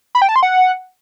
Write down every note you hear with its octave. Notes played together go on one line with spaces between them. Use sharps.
B5
G5
A5
C6
F#5